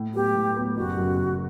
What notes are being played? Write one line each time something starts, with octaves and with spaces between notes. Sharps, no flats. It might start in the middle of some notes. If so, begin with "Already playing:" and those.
Already playing: A2
F#3 B3 G4
A2
F#3 B3
F#1 F#4
F#2 C#3
F#1